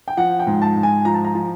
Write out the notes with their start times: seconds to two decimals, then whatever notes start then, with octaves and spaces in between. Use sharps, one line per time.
0.08 G5
0.17 F3 F#5
0.39 G5
0.47 G#2
0.62 A5
0.76 G#2
0.83 G#5
1.05 F3 A#5
1.14 A5
1.25 A#5
1.35 F3